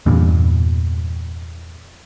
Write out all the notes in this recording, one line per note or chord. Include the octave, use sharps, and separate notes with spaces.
E2 G2 A#2